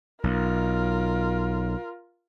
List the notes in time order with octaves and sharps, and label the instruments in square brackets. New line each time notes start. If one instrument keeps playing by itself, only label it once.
[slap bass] B1 [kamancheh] F4 A#4